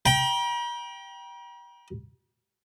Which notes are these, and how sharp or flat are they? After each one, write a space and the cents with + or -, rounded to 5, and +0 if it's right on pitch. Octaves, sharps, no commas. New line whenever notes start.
G5 +0 A#5 +45